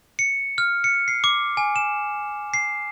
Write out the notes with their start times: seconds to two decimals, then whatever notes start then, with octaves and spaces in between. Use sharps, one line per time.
0.19 C#7
0.58 F6
0.84 C#7
1.08 C7
1.24 D6
1.57 G#5
1.76 E7
2.54 C7